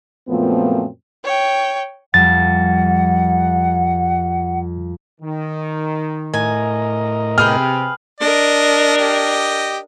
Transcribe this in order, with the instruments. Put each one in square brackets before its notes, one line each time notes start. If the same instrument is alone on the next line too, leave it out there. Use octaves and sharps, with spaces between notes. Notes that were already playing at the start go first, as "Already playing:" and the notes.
[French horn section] F#2 A#2 F3 A3 B3 C4
[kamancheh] C#5 G5
[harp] F2 G3 [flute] F#5 [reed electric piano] A6
[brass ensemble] D#3
[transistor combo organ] A2 A#4 D#5 [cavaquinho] G#5
[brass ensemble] C3 [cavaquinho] G#4 B4 G5 [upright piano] F6
[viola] D4 A#4 [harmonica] D#5
[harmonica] G4 D#5